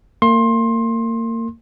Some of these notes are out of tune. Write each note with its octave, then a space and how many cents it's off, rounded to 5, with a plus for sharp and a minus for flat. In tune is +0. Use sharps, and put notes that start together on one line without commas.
A#3 -35 C6 +25